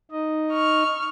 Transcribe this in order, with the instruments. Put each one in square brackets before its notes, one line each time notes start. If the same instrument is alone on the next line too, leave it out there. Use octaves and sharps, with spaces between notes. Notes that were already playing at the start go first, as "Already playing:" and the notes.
[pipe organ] D#4 D#5
[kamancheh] C#6 F6